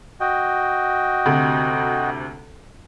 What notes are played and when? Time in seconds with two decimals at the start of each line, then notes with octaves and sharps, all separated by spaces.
0.21 F#4 D#5 G5
1.26 D2 C3